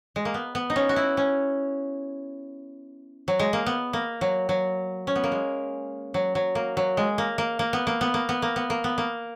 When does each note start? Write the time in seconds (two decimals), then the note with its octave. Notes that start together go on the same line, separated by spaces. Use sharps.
0.16 G#3
0.25 A#3
0.34 B3
0.55 B3
0.70 D#4
0.76 C#4
0.89 F#4
0.96 E4
1.17 C#4
3.28 F#3
3.39 G#3
3.53 A#3
3.66 B3
3.93 A#3
4.21 F#3
4.49 F#3
5.07 C#4
5.16 B3
5.24 A#3
5.32 G#3
6.14 F#3
6.35 F#3
6.55 A#3
6.77 F#3
6.97 G#3
7.18 A#3
7.38 A#3
7.59 A#3
7.73 B3
7.87 A#3
8.01 B3
8.14 A#3
8.29 B3
8.42 A#3
8.56 B3
8.70 A#3
8.84 B3
8.98 A#3